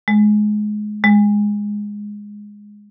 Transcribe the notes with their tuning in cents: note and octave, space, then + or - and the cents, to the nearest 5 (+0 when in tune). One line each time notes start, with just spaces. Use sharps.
G#3 +20
G#3 -5